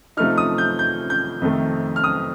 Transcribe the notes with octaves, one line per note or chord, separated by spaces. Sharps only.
C3 F3 A3 D#4 F6
D#6
G6
G6
G6
F2 C3 D#3 A3
F6
D#6